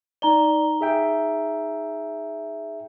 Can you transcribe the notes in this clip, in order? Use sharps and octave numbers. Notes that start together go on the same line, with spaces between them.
D#4 D5 A#5 G7
G#4 E5 G5